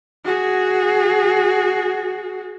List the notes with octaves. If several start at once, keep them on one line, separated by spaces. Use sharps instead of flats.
F#4 G#4